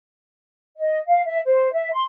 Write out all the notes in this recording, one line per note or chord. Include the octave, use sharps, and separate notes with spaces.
D#5
F5
E5
C5
E5
C6